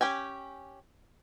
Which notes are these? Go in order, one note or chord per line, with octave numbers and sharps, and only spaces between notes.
C#4 G4 G5 G#5